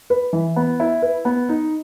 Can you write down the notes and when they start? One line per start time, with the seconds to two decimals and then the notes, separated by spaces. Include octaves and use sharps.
0.10 B4
0.33 E3
0.56 B3
0.80 E4
1.02 B4
1.25 B3
1.49 D#4